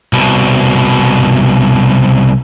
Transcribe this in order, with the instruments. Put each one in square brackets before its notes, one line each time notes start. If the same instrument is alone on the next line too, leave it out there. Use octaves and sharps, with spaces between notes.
[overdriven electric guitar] C2 B2